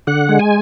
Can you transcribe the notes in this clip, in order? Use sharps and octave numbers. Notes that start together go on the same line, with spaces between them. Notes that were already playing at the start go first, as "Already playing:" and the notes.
D3 F#5
G#3
G#5